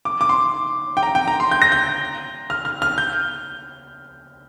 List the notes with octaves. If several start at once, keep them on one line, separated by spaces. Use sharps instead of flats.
D6
D6
C6
G5
A#5
G5
A#5
C6
G6
A#6
G6
F6
F6
F6
G6